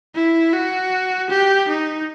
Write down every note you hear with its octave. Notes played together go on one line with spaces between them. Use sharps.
E4
F#4
G4
D#4